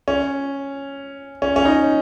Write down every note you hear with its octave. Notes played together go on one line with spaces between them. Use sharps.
C#4
C#4
C#4
D#4